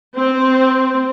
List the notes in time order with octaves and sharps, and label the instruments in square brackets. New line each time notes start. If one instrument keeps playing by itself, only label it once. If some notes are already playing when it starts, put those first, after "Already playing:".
[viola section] C4